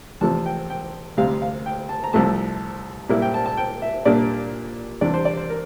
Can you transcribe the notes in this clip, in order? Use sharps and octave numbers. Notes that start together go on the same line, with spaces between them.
E2 C3 F3 A3 A5
G5
G5
D2 C3 G3 F5
F5
G5
A5
A#5
C2 C3 F3 A3 A5
A#2 G3 A#3 E4
G5
A5
A5
G5
E5
A#2 G3 A#3 D4 D5
E2 C3 G3 D4 D5
C5
D5
C5
A#4